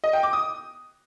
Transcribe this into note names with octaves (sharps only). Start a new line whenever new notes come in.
D#5
G5
D6
D#6